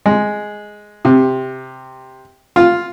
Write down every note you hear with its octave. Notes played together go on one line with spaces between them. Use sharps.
G#3
C3
F4